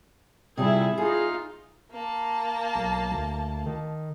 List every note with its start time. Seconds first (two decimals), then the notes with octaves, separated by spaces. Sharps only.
0.57 C3 G3 E4 F4 G#4
0.98 D#4 F4 G#4
1.91 A#3 A5
2.75 B1
3.11 D2
3.66 D#3